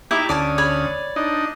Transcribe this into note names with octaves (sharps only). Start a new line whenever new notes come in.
D#4 E4 G4 E5 A#5 D6
D2 C#4 D5 A5 D6 D#6
C#5 D5 B5
D4 D#4 D#5